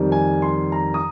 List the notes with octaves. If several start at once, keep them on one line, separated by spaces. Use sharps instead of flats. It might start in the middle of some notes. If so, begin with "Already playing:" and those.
Already playing: F2 D#3 G3
G#5
C6
A#5
D#6